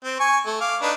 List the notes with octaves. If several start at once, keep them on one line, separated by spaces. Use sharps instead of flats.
C4
G#5 C#6
A3
F5 D6
D4 D#4 B4